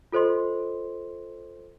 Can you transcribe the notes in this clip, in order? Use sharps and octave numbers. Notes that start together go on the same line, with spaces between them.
F4 A4 C5 D#5 C6